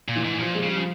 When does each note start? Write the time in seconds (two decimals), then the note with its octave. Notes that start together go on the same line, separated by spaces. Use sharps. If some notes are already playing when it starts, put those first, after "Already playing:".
0.08 A#2
0.16 E3
0.25 G#2
0.40 A#2 F3
0.55 G#3
0.63 C#3 G3
0.76 F3